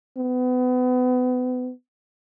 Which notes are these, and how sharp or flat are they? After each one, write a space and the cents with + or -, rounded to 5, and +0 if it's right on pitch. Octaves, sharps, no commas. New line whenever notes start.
B3 +30